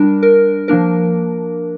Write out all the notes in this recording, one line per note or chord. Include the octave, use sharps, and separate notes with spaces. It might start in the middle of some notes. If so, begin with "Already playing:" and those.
Already playing: G3 D4 A#4
A#4
F3 A#3 D4 A#4